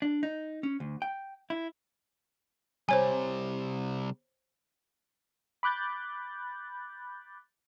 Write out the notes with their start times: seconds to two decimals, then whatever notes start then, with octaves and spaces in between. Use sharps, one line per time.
0.02 D4
0.23 D#4
0.63 C#4
0.80 D2
1.02 G5
1.50 E4
2.89 C3 G3 C5 C#5 G#5
5.63 B5 D6 F#6 G6 A6